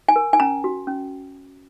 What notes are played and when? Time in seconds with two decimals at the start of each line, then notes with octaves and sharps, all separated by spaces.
0.09 G#5
0.16 A#4
0.33 G#5
0.40 C#4 A#5
0.64 F#4
0.87 C#4